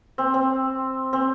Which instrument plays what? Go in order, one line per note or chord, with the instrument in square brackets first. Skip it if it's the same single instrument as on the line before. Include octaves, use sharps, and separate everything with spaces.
[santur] C4
C4
C4